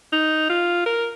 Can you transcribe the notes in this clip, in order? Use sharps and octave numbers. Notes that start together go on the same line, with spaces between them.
D#4
F4
A#4